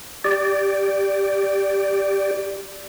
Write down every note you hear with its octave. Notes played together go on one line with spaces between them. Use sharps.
G4 D5